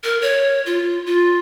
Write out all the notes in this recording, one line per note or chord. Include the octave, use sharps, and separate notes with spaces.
A#4
C#5
F4
F4